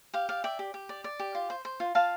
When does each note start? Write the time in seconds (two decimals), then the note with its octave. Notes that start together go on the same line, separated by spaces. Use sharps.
0.14 G4 F5
0.29 D5 F5
0.44 D5 E5 G5
0.59 G4
0.74 G4
0.89 D5
1.04 D5
1.19 G4
1.35 F4
1.50 C5
1.65 C5
1.80 F4
1.95 F4 F5 A5